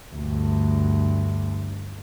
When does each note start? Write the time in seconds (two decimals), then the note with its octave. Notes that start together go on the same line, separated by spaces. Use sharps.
0.15 D2 G2